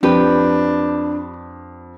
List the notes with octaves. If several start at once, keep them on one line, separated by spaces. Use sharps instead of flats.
F2 D4 G4 B4